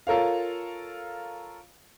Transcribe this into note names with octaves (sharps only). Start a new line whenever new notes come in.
F4 A4 A#4 C#5 F5